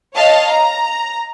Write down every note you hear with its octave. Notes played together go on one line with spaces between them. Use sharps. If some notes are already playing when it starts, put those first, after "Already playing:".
C#5 D#5 F5 A5
A#5